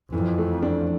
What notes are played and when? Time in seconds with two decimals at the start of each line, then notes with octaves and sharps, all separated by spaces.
0.12 F2 E3
0.38 A3
0.62 D4